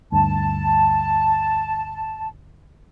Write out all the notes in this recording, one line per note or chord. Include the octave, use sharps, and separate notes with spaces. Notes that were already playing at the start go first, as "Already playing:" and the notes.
D2 G2 A5